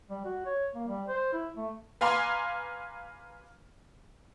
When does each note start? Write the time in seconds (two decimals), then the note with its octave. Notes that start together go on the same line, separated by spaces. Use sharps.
0.10 G3
0.25 F#4
0.46 C#5
0.75 A#3
0.88 G3
1.08 C5
1.33 E4
1.57 A3
2.01 B4 F5 G#5 A#5 C6 D6